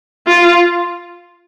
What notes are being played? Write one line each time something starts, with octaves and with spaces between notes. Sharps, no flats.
F4